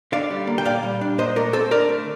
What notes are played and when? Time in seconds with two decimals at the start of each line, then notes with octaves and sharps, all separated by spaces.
0.12 D3 D5 F5
0.30 G3
0.47 A#3
0.58 G5
0.65 A#2 D5 F5
0.83 G3
1.01 D4
1.18 A#2 C5 D#5
1.36 A3 A#4 D5
1.53 C4 A4 C5
1.71 D3 A#4 D5
1.89 A3